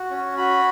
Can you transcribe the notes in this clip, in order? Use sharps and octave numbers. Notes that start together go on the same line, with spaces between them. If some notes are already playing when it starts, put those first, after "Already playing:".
Already playing: F#4
C#4
F#4 B5